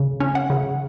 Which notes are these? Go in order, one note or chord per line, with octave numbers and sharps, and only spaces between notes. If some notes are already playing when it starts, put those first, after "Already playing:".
Already playing: C#3
C#4
F#5
C#3